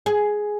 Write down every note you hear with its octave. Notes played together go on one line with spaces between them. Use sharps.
G#4